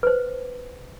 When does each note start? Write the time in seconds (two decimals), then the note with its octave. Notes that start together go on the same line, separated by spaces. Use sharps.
0.03 B4 C5